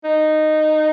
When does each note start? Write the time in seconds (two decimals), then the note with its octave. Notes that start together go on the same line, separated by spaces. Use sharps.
0.04 D#4